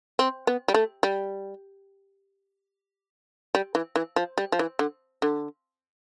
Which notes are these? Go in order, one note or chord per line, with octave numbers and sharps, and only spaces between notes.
C4
B3
G3
A3
G3
G3
E3
E3
F3
G3
F3
E3
D3
D3